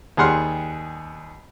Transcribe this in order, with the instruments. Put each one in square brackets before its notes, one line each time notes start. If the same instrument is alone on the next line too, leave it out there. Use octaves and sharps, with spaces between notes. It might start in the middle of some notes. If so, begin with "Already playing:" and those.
[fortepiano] D#2 G3 G#4 F#5 C6 F6